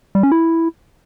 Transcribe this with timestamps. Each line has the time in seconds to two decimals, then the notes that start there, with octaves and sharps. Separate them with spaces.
0.15 G3
0.23 C#4
0.32 E4